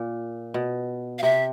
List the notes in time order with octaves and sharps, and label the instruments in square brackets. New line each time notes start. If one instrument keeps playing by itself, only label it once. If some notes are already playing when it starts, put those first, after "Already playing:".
Already playing: [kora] A#2
B2
[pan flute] F5
[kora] C3 [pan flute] E5